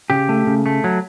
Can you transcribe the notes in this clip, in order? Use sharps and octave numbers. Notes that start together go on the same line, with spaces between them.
C#3 G4
A3
C#3
A3
F#3